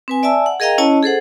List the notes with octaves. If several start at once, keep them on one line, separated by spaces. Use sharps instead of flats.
C4 B4 G#5
D5 E5 G#5 A5 E6
F#5
G#4 A#4 D#5 F5 G5 A#5
C#4 E4 C#5 D#5 A5
G#4 A4 C5 F#5